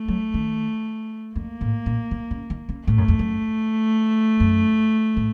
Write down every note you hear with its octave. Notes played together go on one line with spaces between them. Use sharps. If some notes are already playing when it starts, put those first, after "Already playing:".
Already playing: A3
F#3
D#3
F2 A#3
A2
A#2
C3
C#3
D#3
C#3
A2 A3
F#2
F2
F#2
F#2
A2